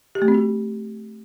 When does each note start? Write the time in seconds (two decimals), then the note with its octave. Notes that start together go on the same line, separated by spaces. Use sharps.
0.15 G4
0.22 A3
0.28 C4
0.34 F#4